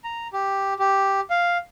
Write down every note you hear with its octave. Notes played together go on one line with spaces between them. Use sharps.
A#5
G4
G4
F5